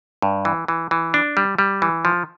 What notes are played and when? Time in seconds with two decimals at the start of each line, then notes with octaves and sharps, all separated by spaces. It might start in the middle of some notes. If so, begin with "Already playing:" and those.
0.22 G2
0.45 E3
0.68 E3
0.91 E3
1.14 D4
1.37 G3
1.59 G3
1.82 E3
2.05 F3